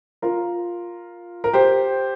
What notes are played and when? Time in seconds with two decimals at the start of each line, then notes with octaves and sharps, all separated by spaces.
0.22 F4 A#4
1.44 A#4
1.53 G4 C5